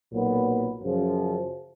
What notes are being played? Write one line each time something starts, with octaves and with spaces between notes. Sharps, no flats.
B1 A#2 F#3 B3
F#2 C#3 F3